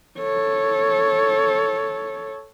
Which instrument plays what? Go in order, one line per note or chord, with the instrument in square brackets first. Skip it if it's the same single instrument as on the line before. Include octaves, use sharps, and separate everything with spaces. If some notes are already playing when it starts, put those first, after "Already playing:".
[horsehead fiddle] A4 C#5